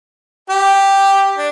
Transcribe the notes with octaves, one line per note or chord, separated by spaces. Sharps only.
G4 G5
D4